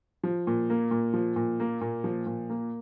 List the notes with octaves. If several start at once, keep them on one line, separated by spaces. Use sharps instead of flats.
F3
A#2
A#3
A#2
F3
A#2
A#3
A#2
F3
A#2
A#3